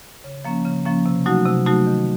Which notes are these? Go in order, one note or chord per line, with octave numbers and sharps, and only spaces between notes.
C#3
F3 A#3 C#4
C#3
F3 A#3 C#4
C3
F#3 A3 D#4 F#4
C3
F#3 A3 D#4 F#4
D#3